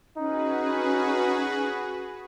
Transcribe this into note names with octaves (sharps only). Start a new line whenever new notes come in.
C#4 D#4 F#4 G#4 B4